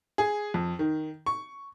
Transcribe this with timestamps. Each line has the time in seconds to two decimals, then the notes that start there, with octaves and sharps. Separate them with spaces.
0.18 G#4
0.54 F2
0.79 D#3
1.26 C#6